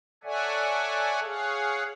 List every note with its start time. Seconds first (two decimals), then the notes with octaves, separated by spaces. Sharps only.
0.24 A4 C#5 D5 E5 F#5 G#5
1.23 G#4 C#5 F5 F#5